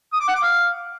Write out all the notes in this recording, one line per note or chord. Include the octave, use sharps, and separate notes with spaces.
D#6
D6
F#5
D6
F5